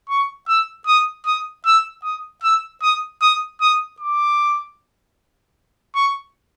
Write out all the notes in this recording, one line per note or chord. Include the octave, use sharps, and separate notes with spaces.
C#6
E6
D#6
D#6
E6
D#6
E6
D#6
D#6
D#6
D6
C#6